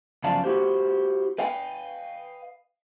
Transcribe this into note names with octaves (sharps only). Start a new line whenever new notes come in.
F#2 C#3 F3 D5 F5 A5
E4 F#4 G4 C5
B4 D#5 F5 G5